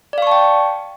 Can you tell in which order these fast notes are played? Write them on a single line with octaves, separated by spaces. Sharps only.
D5 F5 C#6 A5 G5